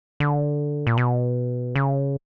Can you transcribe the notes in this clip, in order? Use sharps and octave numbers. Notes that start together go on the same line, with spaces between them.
D3
A#2
B2
C#3